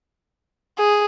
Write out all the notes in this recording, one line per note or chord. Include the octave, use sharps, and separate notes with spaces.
G#4